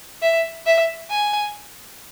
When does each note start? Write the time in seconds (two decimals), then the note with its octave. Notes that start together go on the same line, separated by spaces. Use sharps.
0.22 E5
0.66 E5
1.10 G#5